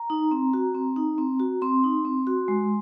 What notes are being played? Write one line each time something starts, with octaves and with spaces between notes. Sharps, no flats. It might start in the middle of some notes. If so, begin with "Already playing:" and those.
Already playing: A#5
D#4
C4
F#4
C4
D#4
C4
F#4
C4 C6
D#4
C4
F#4
G#3